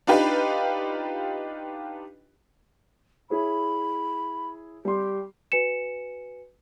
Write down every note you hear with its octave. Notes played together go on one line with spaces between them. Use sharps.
D4 D#4 F4 G4 B4
E4 G#4 C#5 B5
G3 G4 C6
F#4 B4 G#5 C#7 E7